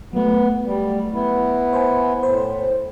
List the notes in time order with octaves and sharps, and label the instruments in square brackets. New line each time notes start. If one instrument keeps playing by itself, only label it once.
[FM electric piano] F#3 A3 [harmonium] B3
[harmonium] G3
B3 E4
[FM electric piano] C5 G#5
[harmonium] A2 [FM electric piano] C5